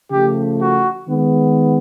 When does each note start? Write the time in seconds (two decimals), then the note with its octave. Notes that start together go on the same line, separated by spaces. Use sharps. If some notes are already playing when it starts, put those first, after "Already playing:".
0.10 C#3 F3 A3 G4
0.59 F#4
1.06 D#3 G#3 B3